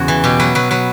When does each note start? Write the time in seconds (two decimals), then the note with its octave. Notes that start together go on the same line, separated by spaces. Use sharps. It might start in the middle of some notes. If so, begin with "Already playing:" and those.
Already playing: E2 C#3 F#4
0.08 E3
0.24 B2 G4
0.40 F#3 B4
0.55 F#3 B4
0.71 F#3 B4